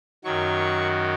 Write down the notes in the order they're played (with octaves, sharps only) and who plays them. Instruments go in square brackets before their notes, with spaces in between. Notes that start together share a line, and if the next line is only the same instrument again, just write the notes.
[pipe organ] F#2 D#3 F#3 C#6